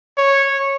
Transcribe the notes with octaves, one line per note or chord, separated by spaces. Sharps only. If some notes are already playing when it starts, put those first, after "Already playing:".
C#5